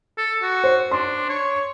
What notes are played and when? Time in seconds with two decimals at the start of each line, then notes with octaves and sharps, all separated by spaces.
0.18 A4
0.42 F#4
0.64 C5
0.91 D4 C6
1.29 C#5